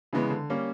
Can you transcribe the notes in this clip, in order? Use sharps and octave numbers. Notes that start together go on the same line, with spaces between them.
C#3 E3 G#3 B3
D3
G3 A#3 C#4